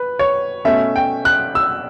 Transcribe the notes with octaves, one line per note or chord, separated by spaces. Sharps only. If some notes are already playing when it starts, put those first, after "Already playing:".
Already playing: B4
C#5
B2 A3 C#4 E5
G5
F#6
E6